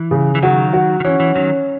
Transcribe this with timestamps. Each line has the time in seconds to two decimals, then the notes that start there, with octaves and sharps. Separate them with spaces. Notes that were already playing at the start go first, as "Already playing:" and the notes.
Already playing: E3
0.11 C#3
0.35 E3
0.42 D#3 F#3 F#4
0.73 F#4
1.00 D#3
1.05 E3 C#4
1.20 E3
1.35 D#3 F#3 C#4